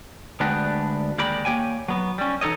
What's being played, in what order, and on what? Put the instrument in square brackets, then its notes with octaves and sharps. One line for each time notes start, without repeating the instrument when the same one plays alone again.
[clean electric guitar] D2 G#3 B3 D4 F#4 G4
D#2 G#3 G4 A#4 D5 B5
A#3 G4 C#5 G5 G#5
F#3 B3
G3 C#4
E3 D#4 A4 C#5 D#5